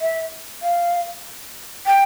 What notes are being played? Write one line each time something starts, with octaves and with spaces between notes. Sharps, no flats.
E5
F5
G5